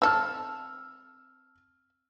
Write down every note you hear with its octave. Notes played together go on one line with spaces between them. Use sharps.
C4 A4 E6 F6